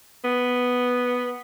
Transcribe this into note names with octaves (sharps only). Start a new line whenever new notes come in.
B3